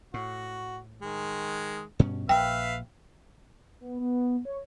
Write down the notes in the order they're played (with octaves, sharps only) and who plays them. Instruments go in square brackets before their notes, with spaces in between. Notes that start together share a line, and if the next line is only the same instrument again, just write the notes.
[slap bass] A2 [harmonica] F#4
[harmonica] D#3 G#3
[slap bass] G2 B2 C#4
[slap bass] A#1 [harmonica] B4 E5 F5 [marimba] G5
[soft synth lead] B3
B3
C#5